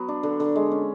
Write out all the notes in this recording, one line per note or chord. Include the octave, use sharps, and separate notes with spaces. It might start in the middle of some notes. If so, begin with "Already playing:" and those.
Already playing: F#3 B3
D4
D3
D3
G#3
C#4